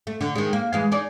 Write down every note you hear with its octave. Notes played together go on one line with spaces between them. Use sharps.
A3
D3
D#3 G#3
A#3
E3 G#3 F5
D#4 G#4 D5